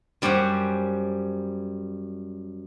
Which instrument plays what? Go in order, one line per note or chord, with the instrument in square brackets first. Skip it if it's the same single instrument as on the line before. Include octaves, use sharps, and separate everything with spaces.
[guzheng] F#2 G3 C#4 C5 F#5